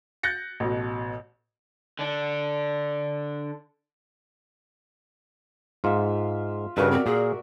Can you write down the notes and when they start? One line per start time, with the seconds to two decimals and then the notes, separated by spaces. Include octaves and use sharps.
0.23 F#6 G6 A6 A#6 C#7
0.60 A1 B2
1.99 D3 D4
5.84 G#2 F4 E5
6.77 G2 C#3 F#4 A#4 B4 E5
6.91 C4 D5
7.06 A#2 G#4